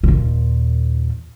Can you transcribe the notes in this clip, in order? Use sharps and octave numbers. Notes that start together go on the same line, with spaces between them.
D#2 A#2